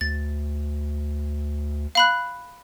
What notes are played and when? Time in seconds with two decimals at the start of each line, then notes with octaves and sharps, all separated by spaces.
0.01 D2 A6
1.95 F5 B5 F#6